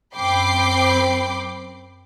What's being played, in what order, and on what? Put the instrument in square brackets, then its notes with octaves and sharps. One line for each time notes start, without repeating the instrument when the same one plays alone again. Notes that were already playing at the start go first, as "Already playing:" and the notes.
[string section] F#2 C4 G5 B5 D6 C7